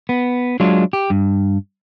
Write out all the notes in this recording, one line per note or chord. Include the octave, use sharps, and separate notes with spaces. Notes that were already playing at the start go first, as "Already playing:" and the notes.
B3
F#3 G#3 D4 F4
G4
G2